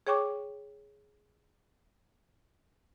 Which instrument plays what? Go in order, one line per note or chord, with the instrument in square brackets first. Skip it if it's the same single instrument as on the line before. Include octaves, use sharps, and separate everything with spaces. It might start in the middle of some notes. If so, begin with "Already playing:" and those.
[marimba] G#4 C#5 G5 C#6 D6